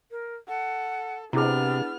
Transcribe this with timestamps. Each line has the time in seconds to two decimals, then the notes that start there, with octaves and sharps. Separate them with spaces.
0.11 A#4
0.48 A4 F#5
1.33 C3 B3 D4 E4 G#4 F6